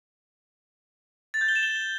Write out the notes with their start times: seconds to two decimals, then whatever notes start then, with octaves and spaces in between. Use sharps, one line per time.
1.34 A6
1.41 G6
1.48 G7
1.56 E7
1.63 G7